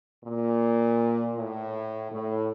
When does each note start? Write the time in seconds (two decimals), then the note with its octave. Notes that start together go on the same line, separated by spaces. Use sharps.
0.25 A#2
1.36 A2
2.11 A2